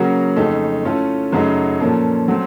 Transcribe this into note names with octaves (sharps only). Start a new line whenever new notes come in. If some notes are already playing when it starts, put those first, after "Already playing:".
Already playing: C#3 F#3 A#3 C#4 F#4
F2 C#3 A3 D#4 A4
A2 A3 C#4 F4 A4
F#2 C#3 F#3 A3 D#4
A#2 F3 A#3 C#4 A4
F#3 A3 C4